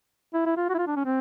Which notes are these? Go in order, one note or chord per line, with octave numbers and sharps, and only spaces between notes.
E4
E4
F4
F#4
E4
F4
D4
C#4
C4